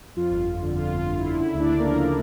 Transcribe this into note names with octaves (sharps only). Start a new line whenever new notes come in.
F2 F4
G1
G1
D3
F2 F4
G1
F4
G1
F4
D3 E4
C#3 E4
D2
D4 D5
A3
A#3 A#4
F3
C#3